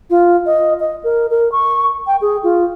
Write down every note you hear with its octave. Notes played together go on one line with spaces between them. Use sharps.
F4
D#5
D#5
A#4
A#4
C#6
G5
G#4
F4